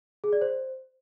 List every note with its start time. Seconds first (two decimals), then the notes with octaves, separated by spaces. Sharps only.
0.24 G#4
0.33 D5
0.41 C5